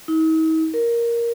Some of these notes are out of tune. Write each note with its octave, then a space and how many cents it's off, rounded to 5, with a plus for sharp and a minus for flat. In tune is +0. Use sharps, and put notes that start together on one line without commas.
D#4 +45
A#4 +5